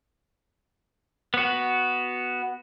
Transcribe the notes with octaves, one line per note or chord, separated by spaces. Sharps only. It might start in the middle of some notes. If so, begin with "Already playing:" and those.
B3 F#4